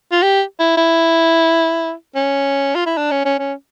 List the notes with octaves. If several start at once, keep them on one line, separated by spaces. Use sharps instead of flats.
F4
G4
E4
E4
C#4
F4
E4
D4
C#4
C#4
C#4